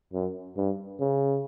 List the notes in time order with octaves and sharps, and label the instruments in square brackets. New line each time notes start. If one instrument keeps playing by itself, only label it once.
[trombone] F#2
G2
C#3